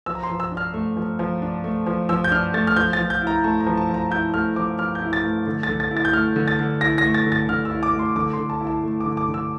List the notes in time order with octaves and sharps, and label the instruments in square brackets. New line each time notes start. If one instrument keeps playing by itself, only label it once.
[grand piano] F3 E6
A#5
C6
F3
E6
D4
F6
A3
F3
F3
D4
A3
F3
F3 E6
G6
D4 F6
A3 A6
F6
F3 G6
A6
F3
G6
E4
A#5
A3 A5
A#5
F3
A5
F3 A#5
E4 G6
A3 F6
F3 D6
F3 F6
G6
E4
A6
A3
D3
A6
D3
A6
E4
A6
G6
A3 F6
D3
A6
D3
E4 A#6
A#6
A3
A6
D3
A6
D3 F6
E6
E4
D6
A3
C6
D3 D6
C6
D3
A5
E4
A5
A3
D6
D3
D6
D3
E6